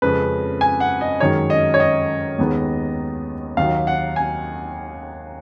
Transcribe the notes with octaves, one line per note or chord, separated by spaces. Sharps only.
F2 C#3 G#3 C#4 B4
G#5
F#5
D#5
F#2 D#3 G#3 C#5
D#5
C#5
D#5
D#2 D#3 G#3 B3
D#2 D#3 F#3 F5
F#5
G#5